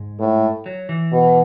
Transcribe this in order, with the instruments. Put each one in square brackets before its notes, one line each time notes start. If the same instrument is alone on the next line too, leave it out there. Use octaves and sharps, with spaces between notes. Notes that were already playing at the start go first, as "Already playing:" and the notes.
Already playing: [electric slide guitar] G#2 G#3
[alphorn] A2
[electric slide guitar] F#3
E3
[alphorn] B2